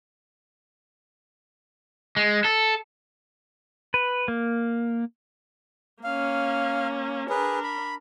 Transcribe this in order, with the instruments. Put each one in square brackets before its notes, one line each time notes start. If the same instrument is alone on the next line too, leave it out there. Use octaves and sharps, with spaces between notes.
[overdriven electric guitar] G#3
A4
[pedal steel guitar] B4
A#3
[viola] A#3 C#4 [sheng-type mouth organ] F5
[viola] D4 A#4 [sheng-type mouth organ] G#4 B4
[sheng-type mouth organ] B5